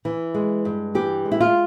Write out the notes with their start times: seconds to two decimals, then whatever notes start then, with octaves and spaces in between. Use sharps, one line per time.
0.05 E3
0.34 G#3
0.65 G2
0.95 E3 G4
1.25 G#3
1.32 E4
1.40 F4